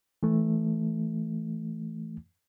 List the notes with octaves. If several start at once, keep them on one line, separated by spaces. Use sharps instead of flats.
E3 A3